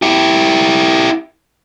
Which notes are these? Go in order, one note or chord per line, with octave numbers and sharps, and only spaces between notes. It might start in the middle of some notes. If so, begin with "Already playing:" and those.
E4 G4